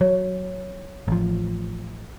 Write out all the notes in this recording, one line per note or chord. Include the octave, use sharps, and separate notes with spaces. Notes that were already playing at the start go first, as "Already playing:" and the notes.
F#3 C#5
A1 F3